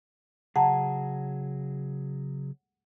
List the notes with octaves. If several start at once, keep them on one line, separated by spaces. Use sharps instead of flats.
C#3 F#3 G#4 F#5 A5 A#5